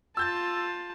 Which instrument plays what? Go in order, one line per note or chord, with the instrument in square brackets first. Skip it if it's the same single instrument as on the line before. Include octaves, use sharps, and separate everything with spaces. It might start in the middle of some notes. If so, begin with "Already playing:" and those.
[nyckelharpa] F4 A5 [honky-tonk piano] E6 G6 A6